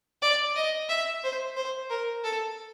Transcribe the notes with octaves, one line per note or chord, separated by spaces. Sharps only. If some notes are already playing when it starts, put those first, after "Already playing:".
D5
D#5
E5
C5
C5
A#4
A4